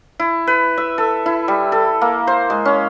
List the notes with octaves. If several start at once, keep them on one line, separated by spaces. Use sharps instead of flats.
E4
B4
E5
A4
E4
G3
A4
A#3
C5
G#3
C#4